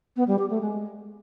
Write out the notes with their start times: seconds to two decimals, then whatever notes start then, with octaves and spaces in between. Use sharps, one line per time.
0.16 B3
0.28 G3
0.39 G4
0.50 A3
0.61 G#3